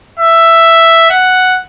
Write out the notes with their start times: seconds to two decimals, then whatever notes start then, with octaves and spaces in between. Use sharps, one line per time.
0.19 E5
1.10 F#5